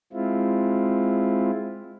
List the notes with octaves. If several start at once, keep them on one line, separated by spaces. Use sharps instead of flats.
G#3 C4 E4 F4